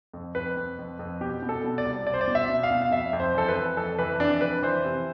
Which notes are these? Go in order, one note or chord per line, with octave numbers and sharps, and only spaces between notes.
F2
F2 B4
F2
F2
F2
B2 G4
B2
A4
B2
D5
C2
C2 D5
C5
D5
B2
E5
B2
F5
B2
F5
F2 E5
F2
C5
E3 A4
B4
F2
F2 A4
E3 B4
F2 D4
F2 B4
E3 C5
C3